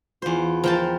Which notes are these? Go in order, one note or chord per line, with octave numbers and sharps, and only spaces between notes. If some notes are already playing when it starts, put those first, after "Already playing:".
E2 F4 C5
F3 A#4 G5 A5